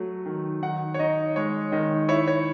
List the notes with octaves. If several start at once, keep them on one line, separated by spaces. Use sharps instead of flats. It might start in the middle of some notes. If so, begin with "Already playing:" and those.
Already playing: F#3 A3
D#3
D#3 F#5
C#5
D#4 D#5
G#3 C#5
D#3 D#5
E4 C#5
C#5